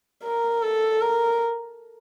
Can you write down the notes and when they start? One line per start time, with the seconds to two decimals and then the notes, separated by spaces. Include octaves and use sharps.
0.24 A#4
0.63 A4
1.01 A#4